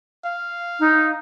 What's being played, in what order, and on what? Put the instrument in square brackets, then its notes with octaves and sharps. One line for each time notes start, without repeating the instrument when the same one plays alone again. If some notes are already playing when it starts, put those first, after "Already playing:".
[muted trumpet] F5
[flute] D#4